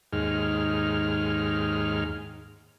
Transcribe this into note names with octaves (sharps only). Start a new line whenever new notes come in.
D#2 G#2 F6